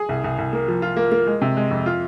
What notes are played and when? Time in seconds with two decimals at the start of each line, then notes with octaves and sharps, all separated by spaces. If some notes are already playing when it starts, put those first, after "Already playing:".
Already playing: G#4
0.09 C2
0.24 C2
0.38 C2
0.53 A#3
0.68 F3
0.82 F4
0.97 A#3
1.12 A#3
1.27 G#3
1.41 C3
1.57 G#3
1.71 F2
1.86 F4